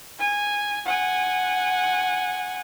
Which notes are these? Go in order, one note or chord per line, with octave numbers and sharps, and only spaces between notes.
G#5
F#5 G#5